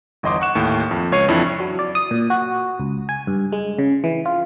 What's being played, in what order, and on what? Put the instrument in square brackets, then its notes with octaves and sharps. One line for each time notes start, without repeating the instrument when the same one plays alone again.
[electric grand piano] G1 E2 D#5 C6 D6
F#5 C#6 F#6 E7
D#2 A2
F2
C#2 C#5 C7 D#7
F2 E3 D4 E4
[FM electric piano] F#3
D5
D#6
A#2
F#4
C#2
G#5
G2
G#3
C#3
E3
F4